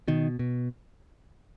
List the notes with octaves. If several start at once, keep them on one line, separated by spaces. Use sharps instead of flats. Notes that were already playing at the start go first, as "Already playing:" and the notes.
B2 D#3
B2